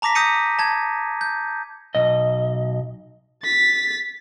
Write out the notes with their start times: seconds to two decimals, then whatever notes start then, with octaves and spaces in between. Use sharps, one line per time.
0.02 A5 A#5 D6 A#6 B6
0.15 D#6 G6 A#6 C#7 D#7
0.59 A5 G#6
1.21 G6
1.95 B1 D#5
3.43 A6 B6